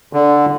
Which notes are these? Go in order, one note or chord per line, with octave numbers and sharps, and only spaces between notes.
D3